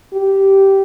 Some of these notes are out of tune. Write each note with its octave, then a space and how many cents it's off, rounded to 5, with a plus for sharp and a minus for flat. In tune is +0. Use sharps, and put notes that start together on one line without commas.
G4 -10